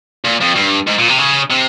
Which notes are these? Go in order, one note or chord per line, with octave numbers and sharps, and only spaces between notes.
A#2
F2
G2
G#2
A#2
C3
C#3
C3